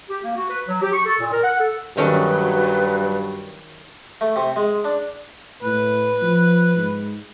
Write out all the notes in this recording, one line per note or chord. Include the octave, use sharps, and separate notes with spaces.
G4
A#3
F#4
B4
F#3
G4
C#6
A4
A#2
A#4
F#5
A4
G2 D#3 F#3 C#4 A4 B4
A3
C3
G#3
D4
A2 B4
F3
G#2